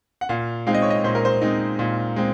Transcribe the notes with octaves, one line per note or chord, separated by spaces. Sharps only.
F#5
A#2 F5
G#3 C4 D#4 F5
D#5
C#5
D#5
A#2 C5
A#4
C5
G#3 C4 D#4
A#2
G#3 C4